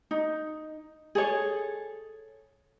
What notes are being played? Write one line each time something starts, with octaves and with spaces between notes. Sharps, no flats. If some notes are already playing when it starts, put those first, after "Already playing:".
D#4
G#4 A4 C#5